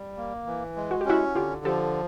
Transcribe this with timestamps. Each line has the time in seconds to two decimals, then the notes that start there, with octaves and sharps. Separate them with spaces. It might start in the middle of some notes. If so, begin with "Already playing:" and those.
Already playing: G3
0.17 A#3
0.46 E3
0.76 G#3
0.91 F#4
1.01 G4
1.05 C#4 E4 F#4
1.35 D3 F4 G4
1.65 F3 G4 A4